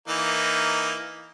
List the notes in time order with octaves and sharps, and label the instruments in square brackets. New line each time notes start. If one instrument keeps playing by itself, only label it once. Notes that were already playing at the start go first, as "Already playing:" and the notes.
[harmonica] E3 A#3 D#4